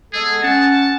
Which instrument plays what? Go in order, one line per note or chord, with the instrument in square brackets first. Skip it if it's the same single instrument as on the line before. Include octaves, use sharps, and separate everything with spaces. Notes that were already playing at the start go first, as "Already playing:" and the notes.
[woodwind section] G#3 B3 A4 [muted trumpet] G#4
[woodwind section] C#4 F#5 [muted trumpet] A5